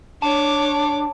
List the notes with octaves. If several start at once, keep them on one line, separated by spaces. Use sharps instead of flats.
D4 C#5 A5 D6